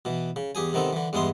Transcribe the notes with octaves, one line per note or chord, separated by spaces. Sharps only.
B2 E3
C#3
E2 G4 G#4 G#5
C3 D#3 B3 C4 A4
D3 E3
E2 G2 G#3 B3 E4 C6